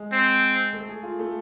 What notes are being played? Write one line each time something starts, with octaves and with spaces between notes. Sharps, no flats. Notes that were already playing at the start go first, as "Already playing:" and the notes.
Already playing: G#3
C4
A3
G#4
F4
A3